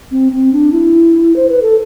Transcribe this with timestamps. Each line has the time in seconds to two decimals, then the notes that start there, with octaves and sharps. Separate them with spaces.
0.11 C4
0.32 C4
0.53 D4
0.73 E4
1.36 C5
1.49 B4
1.62 A4